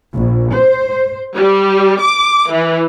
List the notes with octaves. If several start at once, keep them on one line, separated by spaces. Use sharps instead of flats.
A#1
C5
G3
D6
E3